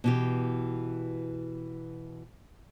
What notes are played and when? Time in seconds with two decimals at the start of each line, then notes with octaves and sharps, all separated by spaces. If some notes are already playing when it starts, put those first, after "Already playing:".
0.04 B2 E3 G4